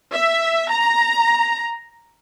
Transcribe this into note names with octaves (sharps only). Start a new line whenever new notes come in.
E5
A#5